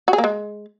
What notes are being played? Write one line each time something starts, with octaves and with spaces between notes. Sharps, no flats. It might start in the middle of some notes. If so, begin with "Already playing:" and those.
F#4
G#4
A#3
G#3